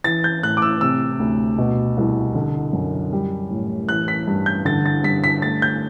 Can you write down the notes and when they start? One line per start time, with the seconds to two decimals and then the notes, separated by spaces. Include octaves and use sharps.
0.04 E3 A6
0.24 G6
0.43 A2 F#6
0.57 D6
0.62 E6
0.81 C3 E6
1.19 D2
1.58 B2
1.97 C2
2.35 D3
2.73 F#2
3.13 G3
3.50 A2
3.89 E3 F#6
4.08 B6
4.27 G2
4.46 G6
4.65 D3 A6
4.86 A6
5.04 G2 B6
5.24 B6
5.42 A3 A6
5.62 G6